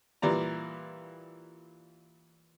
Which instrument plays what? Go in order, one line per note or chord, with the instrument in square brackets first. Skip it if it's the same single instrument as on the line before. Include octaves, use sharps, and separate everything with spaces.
[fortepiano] A#2 E3 G3 D5 A#5